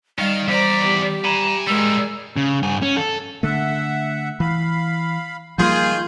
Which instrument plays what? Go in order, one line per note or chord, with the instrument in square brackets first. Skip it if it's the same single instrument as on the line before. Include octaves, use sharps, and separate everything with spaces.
[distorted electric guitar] D#3 [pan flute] G3 [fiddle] F5
[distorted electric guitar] E2 D5 [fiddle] C5 A#5 [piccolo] B6
[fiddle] G4
[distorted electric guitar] G#5 B5 [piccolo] A#5
[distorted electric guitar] G3 F4 [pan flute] G#3 [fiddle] G#4 A#4 [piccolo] E6
[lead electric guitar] C#3
G2 G#5
C#4
A4
[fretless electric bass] D3 A3 [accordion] E5 F#5
[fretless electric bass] E3 [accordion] F5 B5
[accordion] D#3 G6 [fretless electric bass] F3 G3 A#3 [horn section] F4 G#4